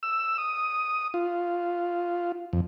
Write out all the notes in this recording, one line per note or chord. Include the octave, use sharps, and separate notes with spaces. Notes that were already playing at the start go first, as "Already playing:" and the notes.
E6
D#6
F4
F2